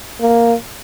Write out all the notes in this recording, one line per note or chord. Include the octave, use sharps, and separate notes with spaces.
A#3